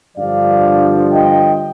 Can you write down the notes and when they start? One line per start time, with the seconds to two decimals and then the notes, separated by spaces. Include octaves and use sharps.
0.16 G2 D3 F3 D5 F5
1.10 D#5 G5